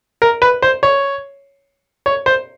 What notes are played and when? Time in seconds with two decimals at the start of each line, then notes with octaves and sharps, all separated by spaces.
0.22 A#4
0.42 B4
0.62 C5
0.83 C#5
2.06 C#5
2.26 C5